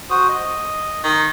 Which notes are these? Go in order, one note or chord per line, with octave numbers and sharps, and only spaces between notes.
F#4 C5 D#6
D#5
D#3